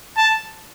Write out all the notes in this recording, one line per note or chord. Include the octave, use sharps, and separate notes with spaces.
A5